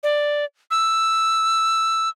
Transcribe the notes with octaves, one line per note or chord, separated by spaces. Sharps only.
D5
E6